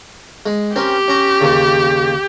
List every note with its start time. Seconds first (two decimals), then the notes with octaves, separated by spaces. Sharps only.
0.46 G#3
0.76 C4 C#4 G4 A#4
1.08 C#4 A#5
1.41 D#2 C#3